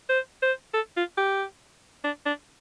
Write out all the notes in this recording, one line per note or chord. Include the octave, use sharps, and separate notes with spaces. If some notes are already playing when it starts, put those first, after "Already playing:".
C5
C5
A4
F4
G4
D4
D4